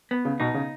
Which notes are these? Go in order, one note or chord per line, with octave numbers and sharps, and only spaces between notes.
B3
C#3
B2 D#4
C#3